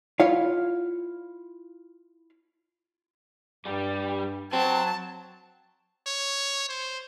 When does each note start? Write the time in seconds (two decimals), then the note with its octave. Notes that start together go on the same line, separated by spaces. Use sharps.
0.20 E4 F4 C#5 F5
3.65 G2 G3 G4
4.53 F#3 C4 A5
6.07 C#5
6.69 C5